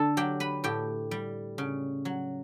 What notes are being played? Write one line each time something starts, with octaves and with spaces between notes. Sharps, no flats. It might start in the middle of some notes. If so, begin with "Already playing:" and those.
Already playing: D3 A4 A5
F#3 G4 G5
B4 B5
A2 G4 G5
G3
C#3
F#3